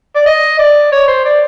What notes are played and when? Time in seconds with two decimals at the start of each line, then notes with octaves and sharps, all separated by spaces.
0.15 D5
0.26 D#5
0.59 D5
0.92 C#5
1.08 C5
1.25 D5